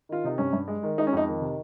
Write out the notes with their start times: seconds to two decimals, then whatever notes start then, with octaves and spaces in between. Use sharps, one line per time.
0.09 D#3 F4
0.24 C3 D#4
0.38 G2 C#4
0.53 G2
0.68 G#3
0.83 D#3
0.98 G#3 D#4
1.07 C#4
1.13 F2 D#4
1.27 D#3
1.41 C3